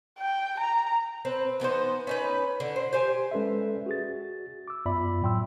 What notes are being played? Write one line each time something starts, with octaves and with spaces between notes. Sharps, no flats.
G5
A#5
C4 B4
E3 B3 D#4 C5
C#4 D#4 B4
D3
C5
G4 C5 G#5
G#3 C#4 A4 B4 D5 E5
F#4 G#4 A6
D6 E6
F#2 B3 F4 D5 E5 B5
A2 F#3 G5 C6 E6